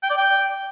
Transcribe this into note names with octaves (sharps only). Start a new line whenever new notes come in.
G5
D5
G5